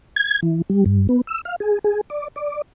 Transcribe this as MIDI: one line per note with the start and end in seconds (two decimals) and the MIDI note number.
0.16 0.40 92
0.43 0.62 52
0.70 0.84 55
0.86 1.07 43
1.09 1.21 59
1.27 1.41 88
1.45 1.56 77
1.60 1.79 68
1.84 2.01 68
2.10 2.28 74
2.36 2.62 74